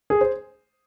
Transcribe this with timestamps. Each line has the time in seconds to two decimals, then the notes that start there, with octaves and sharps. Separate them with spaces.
0.10 G#4
0.21 C5